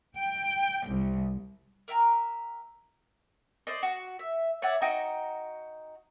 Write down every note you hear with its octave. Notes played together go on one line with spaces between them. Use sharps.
G5
C2
A#4 E5 G5 A#5
C5 D5 D#5
F#4
E5
C#5 D5 E5 F#5
D#4 F#4 G5 A#5